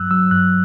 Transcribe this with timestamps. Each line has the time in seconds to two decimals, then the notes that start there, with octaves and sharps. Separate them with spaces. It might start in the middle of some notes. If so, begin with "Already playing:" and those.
Already playing: G2 F#3 E6 F#6
0.11 F#3 E6
0.31 G2 F#6